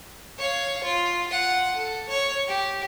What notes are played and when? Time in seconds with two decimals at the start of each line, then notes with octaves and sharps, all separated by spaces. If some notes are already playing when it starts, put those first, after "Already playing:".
0.38 C#5 F5
0.84 F4
1.27 F4 F#5
1.76 A4
2.09 C#5
2.48 G4